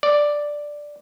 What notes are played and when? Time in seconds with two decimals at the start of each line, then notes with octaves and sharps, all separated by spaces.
0.03 D5